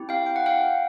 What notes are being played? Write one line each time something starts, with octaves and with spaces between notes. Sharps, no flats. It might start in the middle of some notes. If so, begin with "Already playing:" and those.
Already playing: C4 E4 G4
F5 G5
G5
F#5
F5 G5